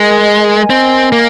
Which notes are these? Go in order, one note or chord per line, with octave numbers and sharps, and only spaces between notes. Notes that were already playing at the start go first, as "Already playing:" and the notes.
Already playing: G#3 A#4 D#5 G#5
C4
A#3